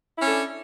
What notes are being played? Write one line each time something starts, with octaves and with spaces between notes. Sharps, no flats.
C#4 D4 E4 A4